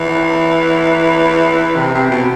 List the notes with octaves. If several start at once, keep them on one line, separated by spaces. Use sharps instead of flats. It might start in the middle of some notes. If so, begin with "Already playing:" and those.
Already playing: E3
C3
C3
B2